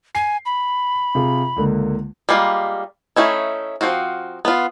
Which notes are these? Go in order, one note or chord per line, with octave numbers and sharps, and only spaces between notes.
G#5 C7
B5
C3 F4 G#4
C#2 D3 A#3
G3 G#3 A#3 F4
A3 C#4 D#4 E4
F3 G3 C4 F4 F#4
B3 F4